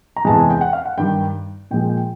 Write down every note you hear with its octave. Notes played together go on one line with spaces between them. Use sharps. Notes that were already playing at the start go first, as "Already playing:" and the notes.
A#5
E2 C3 E3 G#3 A5
G#5
G5
F#5
F5
F#5
G2 D#3 G3 G5
A#2 F3 G#3 G5
G5